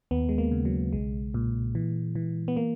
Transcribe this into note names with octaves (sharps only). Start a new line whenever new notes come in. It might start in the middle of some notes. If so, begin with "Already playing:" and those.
D#2 B3
G#3
A#3
C#3
F#3
B1 G#3
A#2
E3
E3
B3
A#3